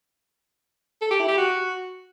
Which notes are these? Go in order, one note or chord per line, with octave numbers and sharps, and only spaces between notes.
A4
G4
E4
G4
F#4